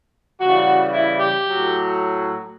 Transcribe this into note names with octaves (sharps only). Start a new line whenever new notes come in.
C#3 E3 G3 F#4
E4
G4
A2 F#3